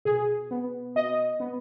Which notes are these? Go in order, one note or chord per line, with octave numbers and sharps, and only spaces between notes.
B2 G#4
B3
B2 D#5
B3